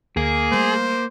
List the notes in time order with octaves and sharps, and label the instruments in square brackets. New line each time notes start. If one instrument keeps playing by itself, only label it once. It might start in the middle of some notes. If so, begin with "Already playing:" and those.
[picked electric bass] D2 [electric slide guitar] A#3 [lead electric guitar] G#4
[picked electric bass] G3 A3 [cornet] C5